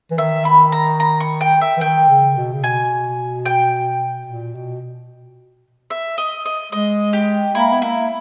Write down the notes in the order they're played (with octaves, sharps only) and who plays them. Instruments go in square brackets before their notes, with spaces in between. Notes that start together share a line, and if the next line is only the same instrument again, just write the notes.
[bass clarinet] E3
[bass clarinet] D#3 [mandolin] E5
[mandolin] B5
A#5
A#5
C#6
G5
E5
[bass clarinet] E3
[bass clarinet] D#3 [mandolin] G5
[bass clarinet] C#3
B2
C#3
[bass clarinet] B2 [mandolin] G#5
[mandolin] G5
[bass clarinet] A#2
B2
[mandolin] E5
D#5
D#5
[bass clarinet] G#3 [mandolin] D#5
[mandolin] G4
[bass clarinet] A#3 [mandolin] E4
[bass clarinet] B3
[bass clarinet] A#3 [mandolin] E4